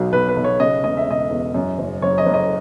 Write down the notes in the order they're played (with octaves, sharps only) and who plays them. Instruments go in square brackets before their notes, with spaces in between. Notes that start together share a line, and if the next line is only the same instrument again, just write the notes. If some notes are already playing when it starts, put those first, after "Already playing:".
Already playing: [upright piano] B1 B2 F#3
B1 B4
B4
B1
C#5
C#3 D#5
E1 D#5
E5
E1 D#5
E2
F#2
F#1
F#1 C#5
D#5
F#1
D#5